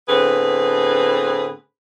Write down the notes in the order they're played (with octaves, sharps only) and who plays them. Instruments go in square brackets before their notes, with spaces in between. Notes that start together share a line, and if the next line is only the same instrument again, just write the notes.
[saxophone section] A2 D3 B3 C4 G#4 B4